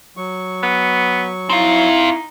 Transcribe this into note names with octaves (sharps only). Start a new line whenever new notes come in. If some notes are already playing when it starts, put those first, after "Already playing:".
F#3 C#6
B3
C4 D#4 E4 F5